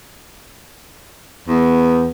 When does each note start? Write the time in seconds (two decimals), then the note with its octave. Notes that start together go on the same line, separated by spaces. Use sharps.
1.48 E2 B3